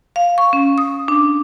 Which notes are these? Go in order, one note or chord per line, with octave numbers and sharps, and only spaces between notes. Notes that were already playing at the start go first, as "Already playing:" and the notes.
F5
C#6
C#4
D#6
D4